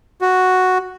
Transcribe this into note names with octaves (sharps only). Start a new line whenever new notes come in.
F#4